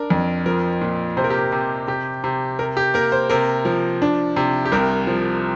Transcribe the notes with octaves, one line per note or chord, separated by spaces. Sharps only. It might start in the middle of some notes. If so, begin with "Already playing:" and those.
Already playing: D4 A#4
F2
F3 A#4
A#2
C3 C5
A#4
G4
A#4
C3
C3 G4
C3
C3 A#4
G4
A#3 A#4
C5
C3 A#4
F3
D4
C3
G4
C2 A#4
F3